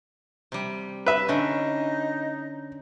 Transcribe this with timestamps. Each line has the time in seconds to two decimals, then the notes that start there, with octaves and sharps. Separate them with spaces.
0.52 C3 G3
1.06 B4 E5
1.29 D3 C#4 D#4